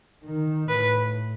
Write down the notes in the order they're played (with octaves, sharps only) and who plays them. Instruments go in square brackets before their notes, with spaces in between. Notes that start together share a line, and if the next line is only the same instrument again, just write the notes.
[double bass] D#3
[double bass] A2 [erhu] B4